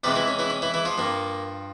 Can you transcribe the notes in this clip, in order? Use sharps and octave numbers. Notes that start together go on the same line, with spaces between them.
E2 C3 E3 G3 G#3 G4
E3 E4
C#4
E3 E4
C#4
E3 E4
E3 E4
F3 F4
G2 F3 A#3